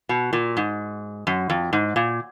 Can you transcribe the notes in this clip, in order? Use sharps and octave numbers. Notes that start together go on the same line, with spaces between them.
B2
A#2
G#2
F#2
F2
G#2
A#2